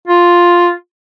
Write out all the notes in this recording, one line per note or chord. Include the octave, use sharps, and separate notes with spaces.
F4